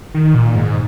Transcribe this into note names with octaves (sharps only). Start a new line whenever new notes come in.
D#3
A#2
G#2